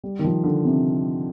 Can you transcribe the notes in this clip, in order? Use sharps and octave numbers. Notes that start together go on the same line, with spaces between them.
G3
D#3
F3
D3
C3